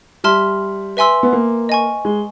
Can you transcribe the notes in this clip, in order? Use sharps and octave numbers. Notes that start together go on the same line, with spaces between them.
G3 E5 A5 C6 F6
B4 E5 G#5 C6 E6
B3
A#3
D#5 G#5 C#6
G#3